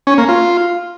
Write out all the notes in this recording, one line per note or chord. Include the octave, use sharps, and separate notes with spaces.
C#4
A#3
F4